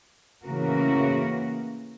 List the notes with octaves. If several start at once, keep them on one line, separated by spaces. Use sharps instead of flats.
A2 C#3 E3 A#3 F#4 A#4